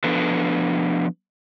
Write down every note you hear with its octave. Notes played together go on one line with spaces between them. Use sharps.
F3 B3 D4 A4 B4